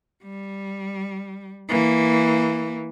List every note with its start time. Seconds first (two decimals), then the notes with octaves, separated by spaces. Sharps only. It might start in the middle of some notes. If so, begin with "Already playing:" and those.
0.23 G3
1.69 E3 A#3